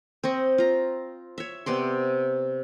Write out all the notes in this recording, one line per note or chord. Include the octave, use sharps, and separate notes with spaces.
C4 D#5 C#6
F4 A#5
C#5 E5
C3 B3 D5 C6